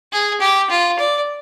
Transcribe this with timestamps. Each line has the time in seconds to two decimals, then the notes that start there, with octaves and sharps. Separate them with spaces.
0.12 G#4
0.41 G4
0.70 F4
0.99 D5